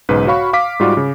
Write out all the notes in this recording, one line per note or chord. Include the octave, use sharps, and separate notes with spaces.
B1 G#2 C#3 B4
F#4 C#5 F5 B5 C#6
F5 D6 B6
G#2 G3 F4 F#4 D5
C#3